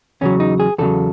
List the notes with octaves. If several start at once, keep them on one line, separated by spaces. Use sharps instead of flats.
E2 C#3 F#3 C#4
D#4
G#4
E2 C#3 F#3 A4